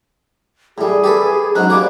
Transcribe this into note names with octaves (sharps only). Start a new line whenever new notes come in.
A2 G3 G#4
G4 A4 B4
G#2 F#3 C#4 F#6
G3 A#3 G#4 D6